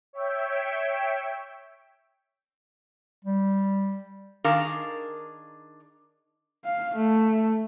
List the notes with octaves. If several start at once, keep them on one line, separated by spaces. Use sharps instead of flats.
C#5 E5 G5
G3
D#3 D4 G#4 A#4 F5
F5
A3